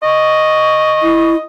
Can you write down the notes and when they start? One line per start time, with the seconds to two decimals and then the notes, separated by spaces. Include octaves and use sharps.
0.03 D#5 C#6
1.03 E4